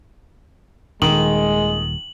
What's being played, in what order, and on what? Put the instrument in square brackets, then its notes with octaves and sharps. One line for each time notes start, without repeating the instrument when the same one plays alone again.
[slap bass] D#1 [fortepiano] D#3 [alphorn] G#3 [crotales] F#7